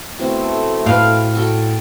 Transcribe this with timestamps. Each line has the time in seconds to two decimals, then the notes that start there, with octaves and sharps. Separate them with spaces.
0.19 B2 A3 C4 E4
0.86 A2 A4 B4 F5 G5
1.35 F#4 A4 G5